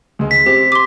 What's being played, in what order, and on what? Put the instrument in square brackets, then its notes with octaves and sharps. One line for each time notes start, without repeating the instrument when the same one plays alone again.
[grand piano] C#2 G#3
[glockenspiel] B6
[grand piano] C4 [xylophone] G4
[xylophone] C6 D6